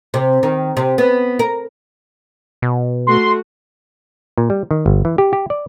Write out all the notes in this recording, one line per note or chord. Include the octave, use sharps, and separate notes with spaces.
C3
D#3
C3
B3
A#4
B2
A3 F#4 C6
A#2
G3
D#3
G1
E3
G4
G4
D5